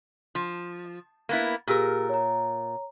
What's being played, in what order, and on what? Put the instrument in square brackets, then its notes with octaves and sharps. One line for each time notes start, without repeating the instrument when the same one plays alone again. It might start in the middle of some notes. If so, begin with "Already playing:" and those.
[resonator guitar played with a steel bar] F3
A#3 B3 E4
[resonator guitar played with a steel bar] A#2 A#4 [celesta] G4 G#4 E6
[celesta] C#5 A#5